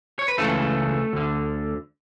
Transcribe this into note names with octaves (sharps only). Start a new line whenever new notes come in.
C#5
B4
C#2 C#3 E3 A3 A4
D2 D3